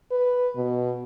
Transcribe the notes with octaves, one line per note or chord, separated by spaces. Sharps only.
B4
B2